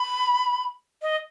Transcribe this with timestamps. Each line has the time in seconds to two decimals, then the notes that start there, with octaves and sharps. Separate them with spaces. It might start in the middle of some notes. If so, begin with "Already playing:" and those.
Already playing: B5
1.02 D#5